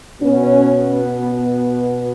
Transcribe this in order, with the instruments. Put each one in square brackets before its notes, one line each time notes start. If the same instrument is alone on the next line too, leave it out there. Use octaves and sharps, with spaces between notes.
[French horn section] B2 B3 C#4